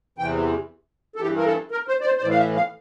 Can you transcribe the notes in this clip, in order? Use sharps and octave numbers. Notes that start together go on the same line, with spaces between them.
E2 C3 E3 G5
A4
G2 E3 G4
A#4
A4
A#4
C5
D5
C5
C5
A2 E3 D5
F5
E5
F5